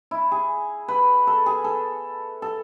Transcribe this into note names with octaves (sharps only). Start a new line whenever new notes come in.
E4
G#4
B4
A4
G#4
A4
A4